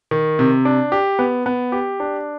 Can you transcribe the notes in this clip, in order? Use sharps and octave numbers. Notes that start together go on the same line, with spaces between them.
D#3
C3
D4
G4
B3
B3
G4
D4